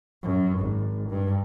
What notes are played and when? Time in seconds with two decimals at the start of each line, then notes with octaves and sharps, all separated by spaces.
0.23 F#2
0.59 G#1
1.10 G2